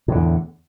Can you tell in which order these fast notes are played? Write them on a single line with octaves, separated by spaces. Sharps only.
A2 D3 E2